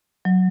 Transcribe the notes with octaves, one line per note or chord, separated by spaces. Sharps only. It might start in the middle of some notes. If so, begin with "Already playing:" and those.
F#3